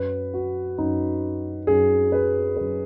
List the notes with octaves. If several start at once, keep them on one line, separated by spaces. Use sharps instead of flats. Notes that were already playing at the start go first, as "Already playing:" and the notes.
Already playing: F#2 F#3 B4
F#4
F#2 F#3 D#4
F#2 F#3 G#4
B4
F#2 F#3 B4